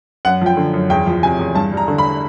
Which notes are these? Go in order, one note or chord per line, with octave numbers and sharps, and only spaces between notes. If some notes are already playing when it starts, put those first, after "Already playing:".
F#2 F#5
F3 G5
D3
F#2
E2 G5
F3
C3 G#5
E2
G2 A5
G3
A#5
D3
B5